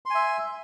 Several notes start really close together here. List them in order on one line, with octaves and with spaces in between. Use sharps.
C6 G#5 E5